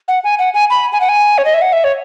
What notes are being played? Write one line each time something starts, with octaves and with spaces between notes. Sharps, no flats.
F#5
G#5
F#5
G#5
B5
G#5
F#5
G#5
C#5
D#5
E5
F#5
E5
C#5